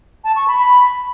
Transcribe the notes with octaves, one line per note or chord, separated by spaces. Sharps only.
A5
C#6
B5
B5